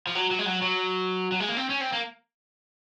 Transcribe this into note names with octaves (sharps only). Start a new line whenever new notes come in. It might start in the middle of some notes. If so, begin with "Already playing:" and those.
F3
F#3
F#3
G#3
F#3
F#3
F#3
G#3
A#3
C4
C#4
C4
A#3